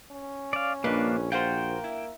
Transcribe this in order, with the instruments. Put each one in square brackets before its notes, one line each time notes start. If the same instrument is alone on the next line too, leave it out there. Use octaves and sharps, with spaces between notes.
[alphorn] C#4
[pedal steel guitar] D5 F5
[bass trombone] A#1 [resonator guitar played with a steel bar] G2 B4 D#5 [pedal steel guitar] A#3 D4
[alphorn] A#3 [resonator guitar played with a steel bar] F4 F#4 C5 [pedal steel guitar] G5
[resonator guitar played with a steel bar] E4